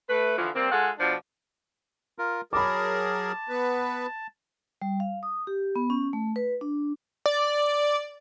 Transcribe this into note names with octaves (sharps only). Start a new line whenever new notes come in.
A3 B4
D3 E3 F3
G3 A#3 C4
G#3 F4 G#4 A4 F#5
B2 F3 D4
F4 A#4
F#3 G#4 A#4 A5 B5 D6
B3 B4
G3
F5
D#6
G4
B3
C#4
A3
B4
D4
D5